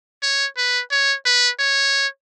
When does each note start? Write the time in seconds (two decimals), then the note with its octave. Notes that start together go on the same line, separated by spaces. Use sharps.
0.22 C#5
0.57 B4
0.91 C#5
1.26 B4
1.59 C#5